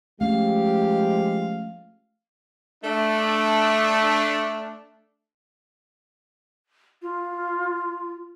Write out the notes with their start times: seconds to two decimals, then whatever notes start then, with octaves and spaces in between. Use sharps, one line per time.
0.21 F3 G#3 A3 C#4 G4 F5
2.83 A3 D4
7.02 F4